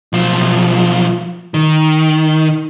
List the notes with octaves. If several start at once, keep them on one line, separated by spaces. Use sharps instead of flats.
B1 F3
D#3